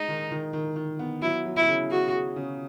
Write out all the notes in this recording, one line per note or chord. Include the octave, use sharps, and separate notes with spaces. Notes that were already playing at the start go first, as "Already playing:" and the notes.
Already playing: G#3 D#4
D#3
D#3
D#3
D#3
B3
F#3 E4
F#3
E4
C#3
F#4 G#4
G#4
C#3